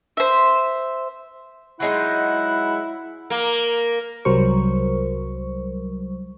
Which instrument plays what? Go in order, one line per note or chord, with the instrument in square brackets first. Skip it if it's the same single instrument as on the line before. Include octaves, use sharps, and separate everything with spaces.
[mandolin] C5 E5
[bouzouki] F#3 G#3 D#4 [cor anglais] E4 [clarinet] F#5
[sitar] A#3
[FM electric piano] C2 F#3 G3 A#4 C5 C#6